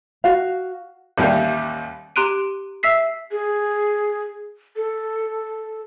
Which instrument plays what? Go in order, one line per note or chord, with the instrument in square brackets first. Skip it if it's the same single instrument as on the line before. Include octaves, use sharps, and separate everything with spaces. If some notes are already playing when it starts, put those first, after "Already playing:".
[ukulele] F#4 F5
[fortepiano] A1 D#2 G3 G4 F5
[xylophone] G4 A#5 C6 F#6 D7 D#7
E5 E6 B6 C7
[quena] G#4
A4